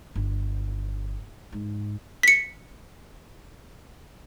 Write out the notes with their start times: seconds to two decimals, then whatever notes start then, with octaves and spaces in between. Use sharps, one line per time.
0.15 G1
1.52 G#2
2.23 B6 C#7